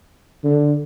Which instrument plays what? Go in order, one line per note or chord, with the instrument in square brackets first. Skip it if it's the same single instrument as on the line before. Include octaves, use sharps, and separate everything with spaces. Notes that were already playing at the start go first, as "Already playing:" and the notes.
[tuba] D3